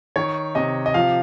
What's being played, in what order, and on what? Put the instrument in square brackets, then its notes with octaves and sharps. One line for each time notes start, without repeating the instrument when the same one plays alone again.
[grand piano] D#3 C#5
C3 D#5
D#5
F3 F5